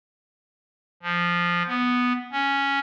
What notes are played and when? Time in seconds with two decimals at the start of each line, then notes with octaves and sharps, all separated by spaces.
1.02 F3
1.67 B3
2.32 C#4